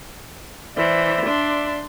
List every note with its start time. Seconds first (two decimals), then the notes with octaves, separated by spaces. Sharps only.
0.77 E3 C5 D5 E5
1.26 D4 C6